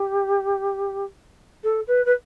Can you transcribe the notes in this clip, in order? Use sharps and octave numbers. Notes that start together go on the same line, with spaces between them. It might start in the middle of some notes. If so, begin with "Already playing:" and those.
Already playing: G4
A4
B4
B4